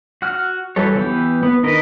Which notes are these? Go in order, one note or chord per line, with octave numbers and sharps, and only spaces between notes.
F#4 F#5 F6
E3 F#3 G3 A4 C#5
E3 B3 G4
B3
D#3 E3 A#4 B4 D#5